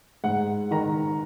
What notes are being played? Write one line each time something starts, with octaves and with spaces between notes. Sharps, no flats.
G#2 F#5
D#3 A#5